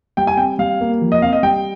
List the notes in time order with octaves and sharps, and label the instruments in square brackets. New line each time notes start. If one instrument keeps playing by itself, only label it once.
[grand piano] G3 [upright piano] G5
[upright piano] G#5
[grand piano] C4 [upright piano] G5
[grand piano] G3 [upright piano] F5
[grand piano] A#3
F3
[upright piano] D#5
[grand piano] C4 [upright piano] F5
[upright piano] D#5
[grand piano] G3 [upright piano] G5